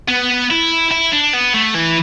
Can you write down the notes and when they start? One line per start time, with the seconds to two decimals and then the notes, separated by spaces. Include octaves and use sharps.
0.08 B3
0.51 E4
0.91 E4
1.12 D4
1.33 B3
1.54 A3
1.74 E3